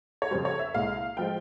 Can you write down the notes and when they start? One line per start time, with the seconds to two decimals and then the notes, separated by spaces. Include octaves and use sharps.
0.22 C#5
0.31 F2 C#3 G3 C5
0.45 C#5
0.59 E5
0.74 C2 A#2 G#3 F5
1.17 F3 G#3 G5